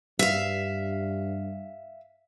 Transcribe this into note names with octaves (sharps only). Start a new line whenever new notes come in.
G2 E5 F5